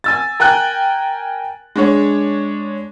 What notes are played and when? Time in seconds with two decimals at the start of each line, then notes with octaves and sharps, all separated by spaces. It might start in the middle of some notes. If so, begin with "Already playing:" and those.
0.04 G#5 E6 A6
0.40 A#4 G5 G#5 F#6
1.76 G#3 D4 C#5